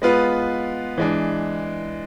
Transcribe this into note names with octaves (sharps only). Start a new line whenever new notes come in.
G#3 B3 F4 B4
E3 G#3 D4